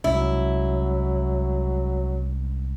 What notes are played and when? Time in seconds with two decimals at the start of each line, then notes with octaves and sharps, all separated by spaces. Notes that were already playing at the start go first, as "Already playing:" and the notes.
0.04 C2 F#3 G#3 C#4 E4